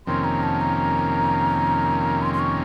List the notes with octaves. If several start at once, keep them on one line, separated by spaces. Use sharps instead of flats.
F2 C3 D#3 A#3 C#4 C6
A#5
A5
A#5
C6
C6
C#6